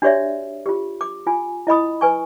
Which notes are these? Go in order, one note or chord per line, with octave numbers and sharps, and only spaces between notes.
D4 F#4 G4 C#5 D5 E5
F4 G4
D6
F4 G#5
E4 D#5 B5 D#6
B4 G#5 C#6